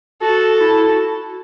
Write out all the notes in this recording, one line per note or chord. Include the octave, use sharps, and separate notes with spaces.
F#4 A4
E4
F#4